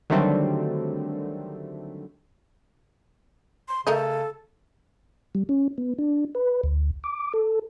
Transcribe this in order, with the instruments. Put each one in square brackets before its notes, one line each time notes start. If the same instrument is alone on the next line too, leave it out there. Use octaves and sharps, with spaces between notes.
[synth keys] D3 D#3 F#3 G3 A3 C4
[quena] C6
[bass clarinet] C#3 [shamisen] A3 A#4 D#5 [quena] A4
[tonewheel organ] G3
C#4
B3
D4
B4
D2
D6
A4